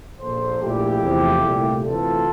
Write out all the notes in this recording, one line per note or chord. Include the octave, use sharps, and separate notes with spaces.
A#1 A#2 F3 A#3 A4 C5
A#1 A#2 A3 E4 G4
E2 C3 F3 A3
C2 A#2 A3
D2 C3 E3 A3 F4 A4